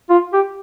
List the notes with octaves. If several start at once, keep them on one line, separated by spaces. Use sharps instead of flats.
F4
G4